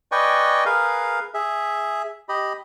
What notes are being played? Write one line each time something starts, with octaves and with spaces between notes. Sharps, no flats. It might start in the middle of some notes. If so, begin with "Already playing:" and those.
B4 D5 D#5 G5 G#5 C#6
G#4 A#4 B4 F5
G#4 E5
G4 D#5 B5